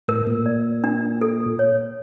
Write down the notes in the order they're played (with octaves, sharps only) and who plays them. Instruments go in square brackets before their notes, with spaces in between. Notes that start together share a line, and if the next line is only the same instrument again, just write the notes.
[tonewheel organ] A2 [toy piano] A#4
[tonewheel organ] A#2
[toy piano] D5
D4
A4
C#5